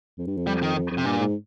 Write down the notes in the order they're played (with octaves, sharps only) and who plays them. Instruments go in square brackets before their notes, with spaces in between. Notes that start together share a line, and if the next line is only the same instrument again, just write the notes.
[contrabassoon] F2
G2
F2
[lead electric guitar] G3
D#3
[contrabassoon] F2
F2
[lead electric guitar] C3
[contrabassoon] G2 [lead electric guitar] A#2
[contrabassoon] G#2